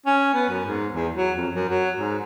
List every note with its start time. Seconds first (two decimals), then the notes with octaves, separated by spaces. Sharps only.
0.06 C#4
0.34 B3
0.49 F#2
0.66 G#2
0.93 E2
1.15 F#3
1.37 F2
1.54 F#2
1.69 F#3
1.97 G#2